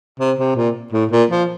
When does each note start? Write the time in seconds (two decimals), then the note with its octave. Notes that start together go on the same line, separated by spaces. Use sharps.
0.20 C3
0.39 C3
0.57 A#2
0.93 A2
1.11 A#2
1.31 F3